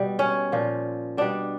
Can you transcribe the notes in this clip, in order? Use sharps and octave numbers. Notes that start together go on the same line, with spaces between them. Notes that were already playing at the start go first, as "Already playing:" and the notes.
Already playing: B2 G3
C#4
A#2 F3
B2 G3 D4